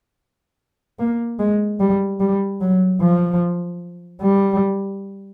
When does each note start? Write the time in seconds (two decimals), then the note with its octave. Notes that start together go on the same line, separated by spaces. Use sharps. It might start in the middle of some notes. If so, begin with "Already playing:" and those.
0.99 A#3
1.39 G#3
1.80 G3
2.20 G3
2.61 F#3
3.01 F3
4.22 G3